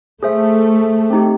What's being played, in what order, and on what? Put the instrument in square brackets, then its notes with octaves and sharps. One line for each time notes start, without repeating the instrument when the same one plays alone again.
[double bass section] A3 [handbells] G#4 C5 E5
[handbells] C4 D#4 G4